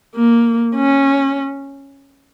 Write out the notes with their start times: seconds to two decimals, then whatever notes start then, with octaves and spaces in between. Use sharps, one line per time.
0.16 A#3
0.76 C#4